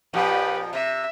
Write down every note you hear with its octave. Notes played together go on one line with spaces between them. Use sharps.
F2 A#2 F3 G4 B4
C3 E5